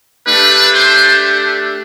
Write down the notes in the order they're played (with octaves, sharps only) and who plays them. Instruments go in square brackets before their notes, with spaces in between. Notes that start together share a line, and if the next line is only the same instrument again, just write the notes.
[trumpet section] A3 D4 G4 B4
C5